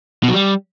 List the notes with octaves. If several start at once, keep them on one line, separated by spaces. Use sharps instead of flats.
B2
F#3
G3